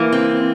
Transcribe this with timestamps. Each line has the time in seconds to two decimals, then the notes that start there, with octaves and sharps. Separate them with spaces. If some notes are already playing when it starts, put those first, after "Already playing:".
Already playing: E3 A#3
0.12 C4